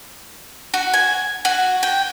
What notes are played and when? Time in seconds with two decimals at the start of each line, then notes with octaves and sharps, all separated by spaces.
0.74 F#4
0.94 G#5
1.45 F#4
1.83 G5